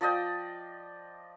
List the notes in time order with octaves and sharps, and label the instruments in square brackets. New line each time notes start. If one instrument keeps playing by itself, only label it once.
[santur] F3 D5 D#5 G5